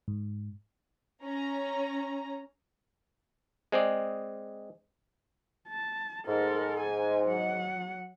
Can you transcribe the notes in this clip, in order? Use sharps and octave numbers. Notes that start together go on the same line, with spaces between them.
G#2
C#4 A#5
G#3 C4 G#4 D5
A5
G#2 A4 A#4
G#5
F#3 F#5